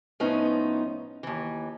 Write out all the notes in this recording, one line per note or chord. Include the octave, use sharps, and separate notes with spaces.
A2 F3 B3 C#4 D#4
D#2 E3